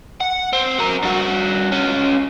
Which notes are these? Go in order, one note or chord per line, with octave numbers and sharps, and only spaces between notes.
F#5
C4
F#4 A#4
G2 F#4
C#4 F4